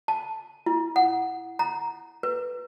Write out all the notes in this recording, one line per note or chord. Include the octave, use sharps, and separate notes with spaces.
A5
E4
F#5
A#5
B4